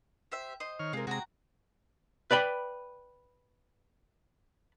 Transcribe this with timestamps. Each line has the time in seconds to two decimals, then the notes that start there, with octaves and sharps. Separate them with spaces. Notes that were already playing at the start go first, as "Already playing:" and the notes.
0.32 G4 C5 E5
0.60 C5 D#5
0.79 D#3 C#5 F6
0.93 C3 G#3 F4 A#4
1.07 C3 G#3 F#4 G5 A#5
2.31 B4 D5 G5 B5